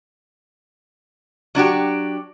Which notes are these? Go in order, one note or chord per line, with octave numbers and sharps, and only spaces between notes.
F#3 D4 F#4 G4